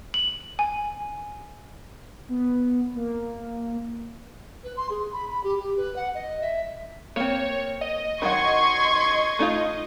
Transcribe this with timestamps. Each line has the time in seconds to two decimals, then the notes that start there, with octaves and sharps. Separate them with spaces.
0.14 F#7
0.59 G#5
2.29 B3
2.95 A#3
4.64 B4
4.77 C6
4.90 G#4
5.13 B5
5.29 B5
5.44 G4
5.59 G4
5.77 B4
5.96 F#5
6.15 D#5
6.42 E5
7.16 A#3 C4 C#5
7.81 D#5
8.22 D#3 F#3 F#5 C6 C#6 G#6
9.39 A3 D#4 F4